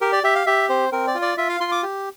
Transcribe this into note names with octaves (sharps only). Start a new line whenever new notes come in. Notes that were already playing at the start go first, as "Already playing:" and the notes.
G4 A#4
D5
G4 E5
F5
G4 E5
C4 C5
C4 A#4
D5
F4
D5
F4 E5
F5
F4 C6
D6
G4